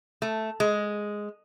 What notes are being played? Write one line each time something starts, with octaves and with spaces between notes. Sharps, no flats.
A3
G#3